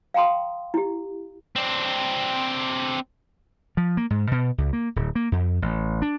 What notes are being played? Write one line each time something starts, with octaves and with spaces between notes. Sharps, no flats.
F5 G5 A#5 C6 D#6
E4 G4
C4 D4
F3
A#3
G#2
B2
C#2
A#3
D1
A#3
F2
A1
D4